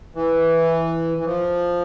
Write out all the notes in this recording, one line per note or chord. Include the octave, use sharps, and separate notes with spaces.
E3
E3
F3